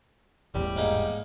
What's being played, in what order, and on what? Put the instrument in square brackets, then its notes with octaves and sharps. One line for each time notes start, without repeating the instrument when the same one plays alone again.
[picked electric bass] E1 A1 E2 [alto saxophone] G3
[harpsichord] G#2 A#3 D#4